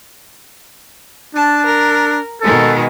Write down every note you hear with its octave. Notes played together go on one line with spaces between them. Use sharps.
D4 A5
A#4
B2 D#3 G#3 A4